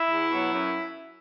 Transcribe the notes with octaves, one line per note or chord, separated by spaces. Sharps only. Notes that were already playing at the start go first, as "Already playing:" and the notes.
Already playing: E4
E2
B2 F#3
F#2